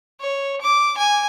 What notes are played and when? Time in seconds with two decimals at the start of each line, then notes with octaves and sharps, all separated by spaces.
0.21 C#5
0.61 D6
0.98 G#5